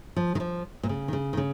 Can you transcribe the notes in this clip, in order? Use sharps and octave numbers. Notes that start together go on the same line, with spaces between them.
F3
D#3
F3
A#2
C#3
D#3
C#3
D#3
C#3